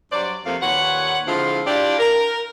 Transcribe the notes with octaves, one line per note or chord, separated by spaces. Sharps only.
G2 F#3 C5 D5
F2 C3 F3 A3 A#3 F5
D#2 A#2 B4 C#5 F#5
D3 F3 G#3 C4 E4 F4
D4 E4 F4 G4 D5
A#4